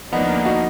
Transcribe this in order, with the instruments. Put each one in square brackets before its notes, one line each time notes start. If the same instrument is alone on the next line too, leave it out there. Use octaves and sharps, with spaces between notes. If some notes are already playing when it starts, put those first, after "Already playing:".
[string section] D2 D3 F3 A#3 D4 [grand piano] B3 D#4
[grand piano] D#4 F#4